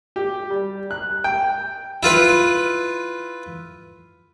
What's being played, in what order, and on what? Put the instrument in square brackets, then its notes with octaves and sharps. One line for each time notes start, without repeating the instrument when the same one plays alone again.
[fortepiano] G4
G3
F#6
G5
[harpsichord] E4 F4 B4 B5